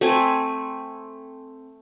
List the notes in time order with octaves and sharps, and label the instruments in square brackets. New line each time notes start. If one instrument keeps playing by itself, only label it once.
[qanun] A3 C4 G#5